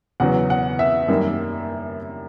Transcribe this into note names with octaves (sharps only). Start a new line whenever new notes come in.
E2 C#3 F#3 B3 F#5
F#5
E5
F#2 D#3 G3 A#3